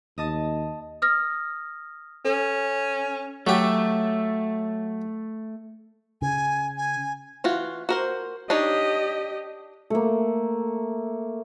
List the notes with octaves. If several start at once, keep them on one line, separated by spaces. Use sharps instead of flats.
D#2 D#5 A5 D#6
D#6 F6 A#6
C#4 A4
F#3 A3 G4
C#3 G#5
G#5
E3 F4 F#4
F#4 A#4 C5
D4 D#4 G4 C#5 D#5
A3 A#3